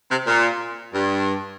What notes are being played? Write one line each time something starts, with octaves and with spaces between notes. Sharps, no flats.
C3
A#2
G2